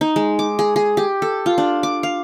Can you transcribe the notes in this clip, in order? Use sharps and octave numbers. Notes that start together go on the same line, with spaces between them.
D#4
G#3
D6
G#4
G#4
G4
A4
F4
D4
D6
F5